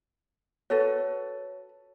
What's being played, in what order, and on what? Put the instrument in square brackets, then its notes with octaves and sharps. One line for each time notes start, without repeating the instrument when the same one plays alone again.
[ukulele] F#4 A4 B4 [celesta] C#5